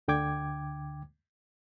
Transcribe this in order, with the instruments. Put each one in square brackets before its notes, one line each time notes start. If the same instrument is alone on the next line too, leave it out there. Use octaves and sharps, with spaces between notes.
[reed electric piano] D2 D3 G5 D6 G#6